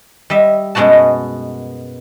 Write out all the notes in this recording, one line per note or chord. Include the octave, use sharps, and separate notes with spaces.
G3 D#5 E5
F#2 B2 G#3 B3 F#4 A5